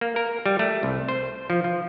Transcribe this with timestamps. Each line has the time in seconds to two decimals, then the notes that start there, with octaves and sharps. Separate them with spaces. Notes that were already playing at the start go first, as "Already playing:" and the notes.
0.01 A#3
0.16 A#4
0.46 G3
0.59 A3
0.83 C2
1.08 C5
1.50 F3
1.64 F3